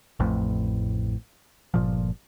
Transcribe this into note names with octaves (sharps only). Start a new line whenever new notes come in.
A1 F2 A2
G1 A#2 F3